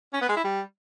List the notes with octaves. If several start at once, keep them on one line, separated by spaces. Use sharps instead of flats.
C#4
B3
G#3
E4
G3